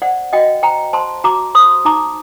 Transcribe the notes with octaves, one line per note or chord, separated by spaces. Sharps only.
C5 D5 F#5
F#4 D#5 G5
C5 G5 A#5
C5 A5 C6
F#4 A#5 D6
C5 C6 D#6
D#4 A#5 D6